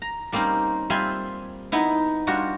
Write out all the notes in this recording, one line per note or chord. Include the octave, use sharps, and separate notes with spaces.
A#5
G3 A#3 C4 C#4 D#4
G3 C4 F4 E5 G#5 C6
B3 D#4 E4
G3 D4 F4 F#4